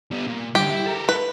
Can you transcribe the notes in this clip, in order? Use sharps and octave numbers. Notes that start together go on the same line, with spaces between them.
G3 B3
A#2
G2 D3 G4
E4
A4 A#4
B4